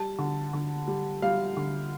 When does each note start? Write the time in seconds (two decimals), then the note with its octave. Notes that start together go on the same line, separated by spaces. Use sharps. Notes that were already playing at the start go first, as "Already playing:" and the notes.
Already playing: G3 A5
0.19 D3
0.53 D3
0.88 G3
1.22 G3 F5
1.57 D3